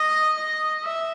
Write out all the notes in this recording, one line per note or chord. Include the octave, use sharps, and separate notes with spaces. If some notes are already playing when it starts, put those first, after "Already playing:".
Already playing: D#5
D#5
E5